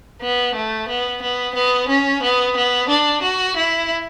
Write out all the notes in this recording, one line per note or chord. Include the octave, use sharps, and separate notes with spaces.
B3
A3
B3
B3
B3
C#4
B3
B3
D4
F#4
E4